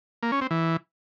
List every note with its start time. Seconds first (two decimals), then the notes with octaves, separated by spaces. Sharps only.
0.23 A#3
0.32 C#4
0.41 C4
0.51 E3